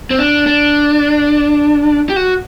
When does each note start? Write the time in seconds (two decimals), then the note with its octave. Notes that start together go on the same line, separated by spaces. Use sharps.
0.10 C4
0.19 D4
0.47 D4
2.09 G4
2.16 F#4